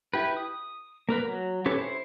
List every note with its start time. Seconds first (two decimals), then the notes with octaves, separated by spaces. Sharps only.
0.14 E4 G4 B4
0.37 D#6
1.09 A#3 A#4 B4
1.24 F#3
1.66 C#4 G4 A4 B4 C#5
1.78 E4 C5